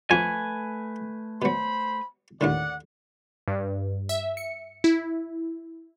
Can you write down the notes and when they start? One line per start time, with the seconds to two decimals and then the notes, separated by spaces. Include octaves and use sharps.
0.11 F2 A3 F4 B4 G#5 D6
1.42 B2 F#3 C5 B5
2.41 D#2 A2 D3 D5 F#5
3.48 G2
4.09 E5
4.37 C#7
4.84 E4